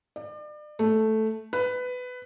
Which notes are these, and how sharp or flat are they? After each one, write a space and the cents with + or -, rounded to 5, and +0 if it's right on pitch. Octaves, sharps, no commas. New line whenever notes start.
D5 +35
A3 -5
B4 +15